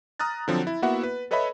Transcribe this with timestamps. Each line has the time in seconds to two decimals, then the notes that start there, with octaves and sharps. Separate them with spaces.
0.20 A#5 D#6 F6 F#6 A6
0.48 D3 F3 F#3 C4
0.67 E4
0.82 A#3 B3 E4 F#4 E5 F#5
1.03 B4
1.31 A4 B4 C#5 D#5 E5 B5